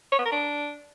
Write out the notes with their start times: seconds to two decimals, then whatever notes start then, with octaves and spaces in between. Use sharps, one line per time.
0.12 C#5
0.19 B3
0.25 A#4
0.32 D4